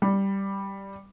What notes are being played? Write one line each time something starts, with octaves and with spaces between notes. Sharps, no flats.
G3